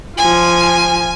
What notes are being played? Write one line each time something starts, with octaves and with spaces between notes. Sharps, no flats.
F3 F4 G#5